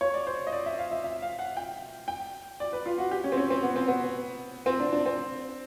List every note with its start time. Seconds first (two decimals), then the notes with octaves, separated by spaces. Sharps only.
0.01 C#5
0.14 D5
0.27 C5
0.47 D#5
0.52 D5
0.66 E5
0.79 F5
0.91 E5
1.04 E5
1.22 F5
1.39 F#5
1.57 G5
2.08 G5
2.60 D5
2.73 B4
2.86 F4
2.98 F#4
3.11 G4
3.24 C#4
3.32 C4
3.37 C#4
3.50 C4
3.63 B3
3.76 C4
3.87 B3
4.66 C4
4.80 D4
4.92 D4
5.06 C4